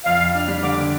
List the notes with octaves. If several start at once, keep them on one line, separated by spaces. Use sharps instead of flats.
F2 F5
F2
D4 F6
G3
D3 D6
D3